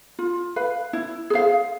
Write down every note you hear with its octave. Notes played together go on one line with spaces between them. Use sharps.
F4
B4 F5
E4
G#4 C5 F5